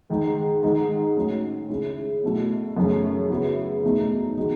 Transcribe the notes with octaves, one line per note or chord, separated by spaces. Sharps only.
G#2 D#3 G#3 D#4
G#2 D#3 G#3 D#4
A2 F#3 C#4
C#3 G#3 C#4 E4
B2 F#3 A3 E4
F#2 C#3 E3 A3 C#4
C#3 F#3 B3 E4
E2 B2 A3 D#4
D#3 G#3 D#4 F#4